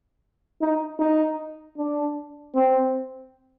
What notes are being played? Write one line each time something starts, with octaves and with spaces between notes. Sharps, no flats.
D#4
D#4
D4
C4